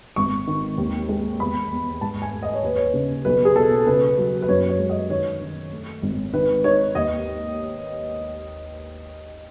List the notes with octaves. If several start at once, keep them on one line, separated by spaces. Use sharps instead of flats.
G#1 C#6
D#3
D#2
G#3
E2 B5
E2
G#2 A5
G#5
A3
D#5
C#5
D#2 B4
C#5
C#3
B1 B4
G#4
B2 A4
C#3 B4
F#3
B4
F#2 C#5
C#5
G#3
D#5
D#3 C#5
D#3
A3
G#1
D#3 B4
D#4 C#5
D#2 D#5